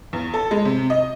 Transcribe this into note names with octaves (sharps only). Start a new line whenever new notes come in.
E2
A4
G#3
C3
D#5